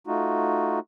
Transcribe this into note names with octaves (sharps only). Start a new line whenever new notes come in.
A3 D#4 F4 F#4